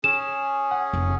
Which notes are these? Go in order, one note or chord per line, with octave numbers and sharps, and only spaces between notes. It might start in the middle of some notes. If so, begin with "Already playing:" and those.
C#4 G#4 E7
F#5
F1 C3